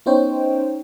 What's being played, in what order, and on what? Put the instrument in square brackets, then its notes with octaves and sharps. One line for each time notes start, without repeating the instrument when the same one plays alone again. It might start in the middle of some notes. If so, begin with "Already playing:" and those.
[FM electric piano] B3 C#4 D#4 C5 C#5 G5